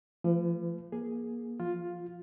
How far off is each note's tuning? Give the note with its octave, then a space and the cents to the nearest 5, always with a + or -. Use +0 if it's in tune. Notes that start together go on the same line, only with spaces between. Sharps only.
F3 -30 A3 +0 B4 +35
A#3 +25 G#4 +0
F3 +0 F4 +10